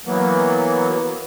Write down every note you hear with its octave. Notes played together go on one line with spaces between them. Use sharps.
E3 F#3 A#3 B3